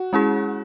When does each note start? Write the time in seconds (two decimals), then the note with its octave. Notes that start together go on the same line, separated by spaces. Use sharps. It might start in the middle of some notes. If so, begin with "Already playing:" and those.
Already playing: F#4
0.13 G#3 C#4 E4 G#4